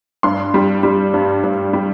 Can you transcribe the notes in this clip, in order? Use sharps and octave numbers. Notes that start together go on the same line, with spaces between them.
G2 C6
G3
G3
G2
G2
G3